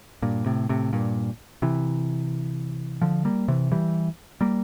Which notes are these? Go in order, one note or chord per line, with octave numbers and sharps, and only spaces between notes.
G2 A#2
A2 C3
A2 C3
G2 A#2
C3 E3
D3 F3
G3 A#3
C3 E3
E3 G3
G3 A#3